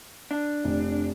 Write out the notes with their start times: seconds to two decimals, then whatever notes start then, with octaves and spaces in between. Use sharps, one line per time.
0.31 D4
0.64 F1